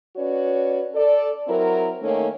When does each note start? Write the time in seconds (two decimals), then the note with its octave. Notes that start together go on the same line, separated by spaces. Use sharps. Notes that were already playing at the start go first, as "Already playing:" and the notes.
0.17 C#4 F#4 B4 C#5 D5
0.95 A4 D5
1.47 F#3 C4 E4 A#4
2.02 D#3 A3 A#3 C#4